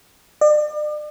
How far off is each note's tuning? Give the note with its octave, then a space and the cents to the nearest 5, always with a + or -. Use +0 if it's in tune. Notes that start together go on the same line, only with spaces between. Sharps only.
D5 +40